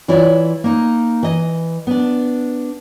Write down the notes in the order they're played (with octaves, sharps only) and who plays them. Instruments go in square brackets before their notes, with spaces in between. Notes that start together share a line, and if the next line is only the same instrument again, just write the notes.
[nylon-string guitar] E3 E4 F4 C#5 D5
A#3 D#4
E3 D#5
B3 D4